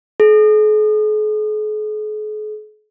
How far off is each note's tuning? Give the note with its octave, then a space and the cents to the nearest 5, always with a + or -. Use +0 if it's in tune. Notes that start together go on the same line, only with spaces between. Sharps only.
G#4 +45